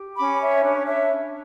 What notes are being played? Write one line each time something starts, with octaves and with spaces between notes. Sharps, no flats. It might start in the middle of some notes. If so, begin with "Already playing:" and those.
Already playing: G4
C#4 B5 D6
C#5 E5
D4 C#5
C#5 E5
D4